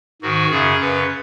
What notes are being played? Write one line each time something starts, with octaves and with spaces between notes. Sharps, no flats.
G#2 D#3 F#4
F#2 C#3 G#4
F#2 C#3 B4